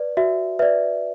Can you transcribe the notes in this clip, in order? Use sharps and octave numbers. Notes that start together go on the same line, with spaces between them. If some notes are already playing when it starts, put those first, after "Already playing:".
Already playing: B4 D5
F#4 E5
B4 D5 E5